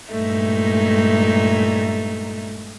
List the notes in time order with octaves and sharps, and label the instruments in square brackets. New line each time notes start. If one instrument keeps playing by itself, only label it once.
[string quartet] G2 A#2 G#3 A3 D#4 E5